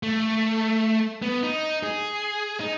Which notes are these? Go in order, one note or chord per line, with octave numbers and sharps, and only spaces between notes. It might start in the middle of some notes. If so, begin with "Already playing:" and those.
A3
B3
D#4
G#4
D#4